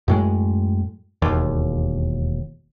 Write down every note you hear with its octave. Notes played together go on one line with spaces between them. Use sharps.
F#2 A2 G#3
E1 D#2